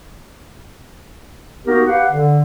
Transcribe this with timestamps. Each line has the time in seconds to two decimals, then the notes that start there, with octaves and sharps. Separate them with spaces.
1.67 A#3 B3 D#4 F#4 G4 A#4
1.86 B3 G4 F5 F#5
2.11 D3